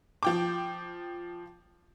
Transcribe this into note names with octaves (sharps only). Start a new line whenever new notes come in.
F3 G5 D6